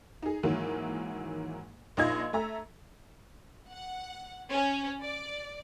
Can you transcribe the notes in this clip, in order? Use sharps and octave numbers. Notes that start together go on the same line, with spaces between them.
D#4 G#4
G#2 D#3 E3 F#3 A#3
A#1 D#4 F4 D#5 F5 G#6
A3 A4 E5 A#5
F#5
C#4
D5